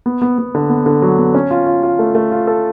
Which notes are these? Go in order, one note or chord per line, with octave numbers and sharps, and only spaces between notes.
B3
B3
B3
D3
B3
D3
F#3
B3
C#4
F4
F4
F4
A3
A3
F4
A4